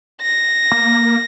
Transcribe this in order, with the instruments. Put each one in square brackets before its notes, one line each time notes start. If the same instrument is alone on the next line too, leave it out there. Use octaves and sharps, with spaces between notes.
[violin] A#6
[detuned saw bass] A#3